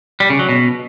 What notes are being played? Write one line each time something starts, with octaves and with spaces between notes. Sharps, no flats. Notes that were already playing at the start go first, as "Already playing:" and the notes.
G3
C#3
F#3
B2